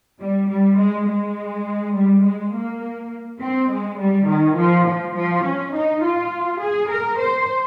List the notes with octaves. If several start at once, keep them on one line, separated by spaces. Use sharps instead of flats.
G3
G3
G#3
G#3
G3
G#3
A#3
C4
G#3
G3
D#3
F3
F3
F3
C#4
D#4
F4
G#4
A#4
C5